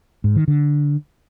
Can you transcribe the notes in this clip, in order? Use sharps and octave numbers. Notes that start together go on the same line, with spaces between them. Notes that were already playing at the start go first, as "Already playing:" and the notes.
G#2
D#3
D3